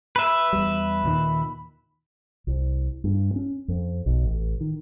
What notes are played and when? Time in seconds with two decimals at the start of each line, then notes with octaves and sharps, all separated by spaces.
0.16 B4 E5
0.53 E2 G3
1.03 D#2 A#2 D#3
2.47 C2
3.04 G2
3.36 C#4
3.68 F2
4.06 B1
4.24 A1
4.60 D#3